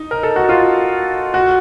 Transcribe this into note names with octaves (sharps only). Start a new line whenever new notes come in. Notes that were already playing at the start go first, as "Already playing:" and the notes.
Already playing: D#4
A#4
A4
F#4
F4
F#4